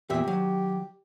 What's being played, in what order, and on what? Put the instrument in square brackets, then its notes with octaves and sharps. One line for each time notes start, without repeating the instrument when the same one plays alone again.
[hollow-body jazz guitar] E2 A#2 E5 [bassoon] G4
[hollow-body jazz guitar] D#3 F#3